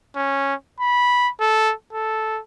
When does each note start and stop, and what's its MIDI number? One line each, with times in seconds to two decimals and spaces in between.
0.16 0.54 61
0.80 1.29 83
1.40 1.73 69
1.93 2.40 69